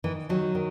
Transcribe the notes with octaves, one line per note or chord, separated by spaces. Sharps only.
D#3 E3
D#3 F#3
D#3